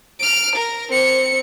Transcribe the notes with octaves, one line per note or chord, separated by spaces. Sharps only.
F6 D7
A#4
C4 C#7